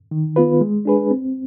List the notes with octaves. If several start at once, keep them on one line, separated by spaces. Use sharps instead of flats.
D#3
B3 F4 B4
G#3
D4 G#4 B4
C4